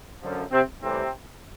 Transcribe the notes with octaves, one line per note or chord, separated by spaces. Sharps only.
F#2 D3 F3
C3 C4
A2 C3 E3 G3 C4